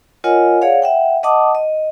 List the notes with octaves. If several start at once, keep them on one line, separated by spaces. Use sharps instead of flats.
F4 A#4 C#5 D#5 F#5 G#5
G#4 C#5 D5 F5 F#5
E5 F#5 G5
D#5 F#5 A5 D6 D#6
D#5